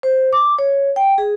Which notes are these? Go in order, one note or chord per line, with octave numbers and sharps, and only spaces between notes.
C5
D6
C#5
G5
G#4